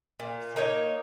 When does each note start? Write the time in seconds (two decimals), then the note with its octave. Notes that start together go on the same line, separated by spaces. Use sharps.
0.20 A#2
0.56 A#3 D#4 C#5